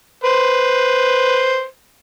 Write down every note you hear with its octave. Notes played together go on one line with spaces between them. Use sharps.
B4 C5